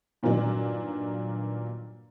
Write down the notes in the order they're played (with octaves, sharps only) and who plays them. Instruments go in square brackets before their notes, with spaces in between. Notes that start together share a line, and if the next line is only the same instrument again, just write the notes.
[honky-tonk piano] G2 A#2 D#3 F#3 D4